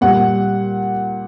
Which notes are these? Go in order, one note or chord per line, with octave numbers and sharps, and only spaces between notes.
A#2 G3 F#5